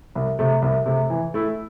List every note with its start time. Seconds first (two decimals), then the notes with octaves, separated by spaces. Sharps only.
0.15 C2
0.39 C3 A3
0.62 C2
0.86 C3 A3
1.10 E3
1.34 A3 E4